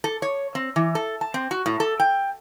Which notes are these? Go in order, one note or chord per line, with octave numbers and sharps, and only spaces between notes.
A4
C#5
C4
E3
A4
A5
C4
F#4
A2
A4
G5